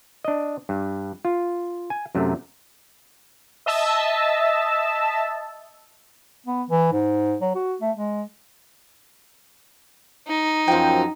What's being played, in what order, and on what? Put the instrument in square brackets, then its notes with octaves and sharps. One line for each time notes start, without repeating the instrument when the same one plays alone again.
[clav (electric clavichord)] D4 D#5
G2
F4
G#5
F#2 C3 A3
[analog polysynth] D#5 E5 A5 E6
[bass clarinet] B3
E3
G#2
F#3
F#4
A3
G#3
[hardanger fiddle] D#4
[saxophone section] F#2 F3 [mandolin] C4 G5